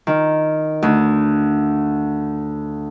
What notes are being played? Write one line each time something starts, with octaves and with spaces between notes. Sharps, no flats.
D#3
D2